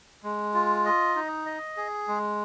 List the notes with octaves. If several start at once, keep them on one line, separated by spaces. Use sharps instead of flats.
G#3
F4
D#5
D#4
D#5
G#4
G#3